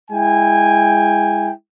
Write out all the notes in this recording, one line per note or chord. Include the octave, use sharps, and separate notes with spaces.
G#3 E4 G5 G#5